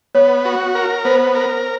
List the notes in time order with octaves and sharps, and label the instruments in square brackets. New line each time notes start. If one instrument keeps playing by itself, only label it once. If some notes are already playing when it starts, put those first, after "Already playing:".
[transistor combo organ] B3 [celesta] C#5
[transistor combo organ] F#4
A#4
[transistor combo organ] B3 [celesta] C5
[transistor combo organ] A#4